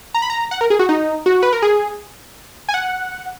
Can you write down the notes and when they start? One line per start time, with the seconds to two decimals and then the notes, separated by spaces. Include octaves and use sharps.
0.14 A#5
0.22 B5
0.30 A#5
0.51 F#5
0.61 A#4
0.70 G#4
0.79 F#4
0.89 D#4
1.26 F#4
1.43 B4
1.53 A#4
1.62 G#4
2.69 G#5
2.74 F#5